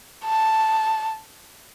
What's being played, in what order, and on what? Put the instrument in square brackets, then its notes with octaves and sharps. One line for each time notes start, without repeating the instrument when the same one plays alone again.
[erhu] A5